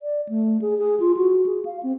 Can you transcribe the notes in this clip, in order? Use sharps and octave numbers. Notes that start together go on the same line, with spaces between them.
D5
A3
G#4
G#4
F4
F#4
G#4
F5
C4